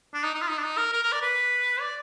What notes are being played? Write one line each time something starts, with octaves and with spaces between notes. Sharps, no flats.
D4
D#4
D#4
F4
D#4
D4
D#4
A#4
A#4
A#4
D5
B4
D5